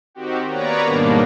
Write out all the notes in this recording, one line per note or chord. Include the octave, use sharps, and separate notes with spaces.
D#3 C4 F#4 G4
A#3 B3 B4 C#5 D5 A#5
G#2 B2 D#3 G3 A#3 D4